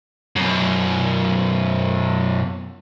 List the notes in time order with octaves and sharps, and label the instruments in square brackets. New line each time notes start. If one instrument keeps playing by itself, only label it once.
[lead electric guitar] F#2 B2